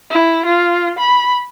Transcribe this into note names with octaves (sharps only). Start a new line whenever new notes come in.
E4
F4
B5